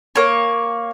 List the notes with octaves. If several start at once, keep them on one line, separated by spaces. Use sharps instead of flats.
A#3 C#5